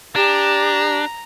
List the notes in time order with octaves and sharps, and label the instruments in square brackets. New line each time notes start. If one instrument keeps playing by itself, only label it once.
[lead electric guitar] D4 [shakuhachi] G4 [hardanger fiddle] A#5